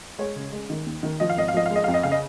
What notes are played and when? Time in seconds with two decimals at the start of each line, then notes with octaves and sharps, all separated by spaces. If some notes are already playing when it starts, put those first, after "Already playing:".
0.19 G#3 C#5
0.36 C#3
0.52 G#3
0.70 D#3
0.87 D#2
1.03 D#3
1.20 F3 D#5
1.29 F5
1.37 G#1 D#5
1.48 F5
1.54 F3 D#5
1.66 F5
1.71 G#3
1.76 D#5
1.84 F2 F5
1.94 D#5
2.03 C#3 F5
2.12 D#5